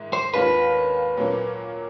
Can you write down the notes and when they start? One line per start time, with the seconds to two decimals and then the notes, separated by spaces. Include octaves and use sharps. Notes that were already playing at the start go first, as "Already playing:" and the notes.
Already playing: G#2 D#3 G#3 E4
0.13 C5
0.33 D#2 D#3 G#3 C#4 F4 B4
1.17 A#2 F#3 A#3 C#4